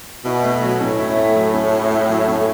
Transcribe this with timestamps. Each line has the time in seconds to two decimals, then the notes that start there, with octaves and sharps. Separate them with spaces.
0.25 B2 E4
0.44 A3
0.62 F#3
0.80 A2 C#4
0.99 E4
1.17 A3
1.36 F#3
1.54 C#4
1.73 E4
1.91 A3
2.09 F#3
2.28 C#4